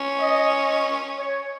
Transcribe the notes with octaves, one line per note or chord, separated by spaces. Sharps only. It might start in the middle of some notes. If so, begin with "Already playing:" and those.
Already playing: C#4
D#5
C#5